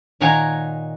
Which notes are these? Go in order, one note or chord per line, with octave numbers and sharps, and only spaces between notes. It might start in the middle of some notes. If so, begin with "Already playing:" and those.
A#2 D#3 C#5 F#5 G#5 A#5